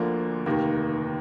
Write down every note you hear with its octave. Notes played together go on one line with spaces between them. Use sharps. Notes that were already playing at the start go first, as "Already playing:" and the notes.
Already playing: D2 D3 F3 A#3
F1 D#2 D#3 A#3